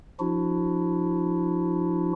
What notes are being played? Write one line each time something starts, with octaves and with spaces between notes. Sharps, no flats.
F3 D4 E4 F#4